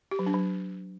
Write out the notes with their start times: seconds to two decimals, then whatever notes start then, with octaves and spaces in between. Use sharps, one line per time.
0.11 G4
0.19 F#3
0.26 D4
0.34 F#3